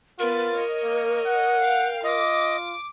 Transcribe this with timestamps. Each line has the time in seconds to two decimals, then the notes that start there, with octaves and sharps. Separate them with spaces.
0.19 B3 F4 A#4 B4 A6
0.53 C#5 D#5
0.83 A#3
1.26 F#5
1.60 F5 G5
2.04 F4 D#5 D6